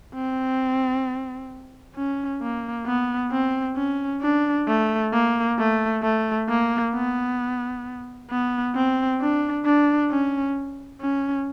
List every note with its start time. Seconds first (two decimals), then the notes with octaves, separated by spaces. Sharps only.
0.15 C4
1.96 C#4
2.42 A#3
2.86 B3
3.32 C4
3.77 C#4
4.22 D4
4.68 A3
5.13 A#3
5.58 A3
6.03 A3
6.49 A#3
6.94 B3
8.31 B3
8.75 C4
9.21 D4
9.66 D4
10.11 C#4
11.01 C#4